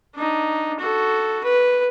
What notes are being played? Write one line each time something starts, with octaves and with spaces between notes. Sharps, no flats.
D4 D#4
F#4 A4
B4